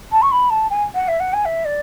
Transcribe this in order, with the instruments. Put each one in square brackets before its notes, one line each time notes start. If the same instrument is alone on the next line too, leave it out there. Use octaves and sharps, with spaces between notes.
[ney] A5
C#6
B5
A5
G#5
F#5
E5
F#5
G#5
E5
D5